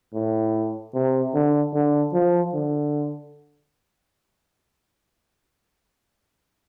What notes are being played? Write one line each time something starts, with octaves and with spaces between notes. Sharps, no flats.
A2
C3
D3
D3
F3
D3